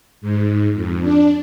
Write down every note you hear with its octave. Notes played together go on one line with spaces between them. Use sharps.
G#2
F2
D4